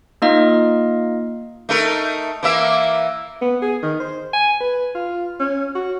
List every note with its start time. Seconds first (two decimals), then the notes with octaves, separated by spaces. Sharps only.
0.22 A#3 D#4 F4 D#5 F5
1.69 A3 D#4 A#4
2.43 E3 A#3 E5
3.42 B3
3.62 G#4
3.83 D#3
4.00 C5
4.33 G#5
4.60 B4
4.95 F4
5.40 C#4
5.75 F#4